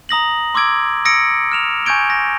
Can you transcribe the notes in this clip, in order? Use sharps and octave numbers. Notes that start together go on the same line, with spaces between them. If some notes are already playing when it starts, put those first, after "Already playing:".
A#5 D#6 A#6 F#7
C6 D6 E6 G#6 D7
D#6 E6 A#6 C#7 D7
F6 E7 F7
G#5 C#6 G6 G#6 D7 G7
A#6